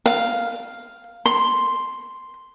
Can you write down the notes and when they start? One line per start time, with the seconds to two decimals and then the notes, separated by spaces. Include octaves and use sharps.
0.06 F5
1.26 C6